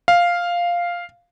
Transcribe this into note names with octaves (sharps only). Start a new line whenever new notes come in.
F5